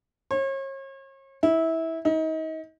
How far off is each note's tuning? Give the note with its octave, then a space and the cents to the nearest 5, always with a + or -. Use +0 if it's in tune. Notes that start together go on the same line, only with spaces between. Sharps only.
C#5 -40
E4 -20
D#4 +35